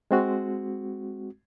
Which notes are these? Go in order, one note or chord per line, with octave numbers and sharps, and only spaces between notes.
G#3 C4 F#4